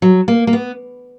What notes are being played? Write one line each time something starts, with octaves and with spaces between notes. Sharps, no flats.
F#3
A#3
A#3
B3